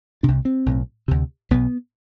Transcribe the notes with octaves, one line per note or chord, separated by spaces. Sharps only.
C2 C3 D4
C4
B1 A2
D2 C3
B1 B2 B3